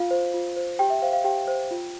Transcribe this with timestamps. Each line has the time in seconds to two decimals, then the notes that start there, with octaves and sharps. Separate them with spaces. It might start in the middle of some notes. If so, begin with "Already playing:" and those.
Already playing: F4 F5
0.11 C5
0.34 F4
0.56 C5
0.79 G4 G5
0.90 E5
1.02 C5 F5
1.13 F5
1.24 G4 G5
1.48 C5
1.71 F4